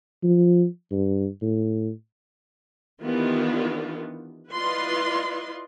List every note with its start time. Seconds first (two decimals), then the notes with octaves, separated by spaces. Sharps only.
0.23 F3
0.92 G2
1.42 A2
3.02 D#3 E3 B3 D4 F4 G4
4.51 E4 F4 B4 D5 D#5 C6